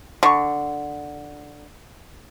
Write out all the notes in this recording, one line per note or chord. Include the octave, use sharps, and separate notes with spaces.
D3 C#6